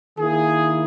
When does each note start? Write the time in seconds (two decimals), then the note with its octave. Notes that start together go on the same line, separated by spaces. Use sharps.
0.18 D#3 A#3 E4 G#4